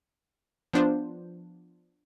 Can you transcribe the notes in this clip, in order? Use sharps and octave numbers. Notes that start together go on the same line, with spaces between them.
F3 B3 D4 F4 C5